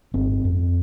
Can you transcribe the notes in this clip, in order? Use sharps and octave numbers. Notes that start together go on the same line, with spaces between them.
G1 C4
F2